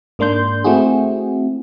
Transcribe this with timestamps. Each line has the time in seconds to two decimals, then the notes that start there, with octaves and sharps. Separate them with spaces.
0.19 G#2 A#3 D4 C6 G6
0.64 A3 C4 E4 F#4 G#4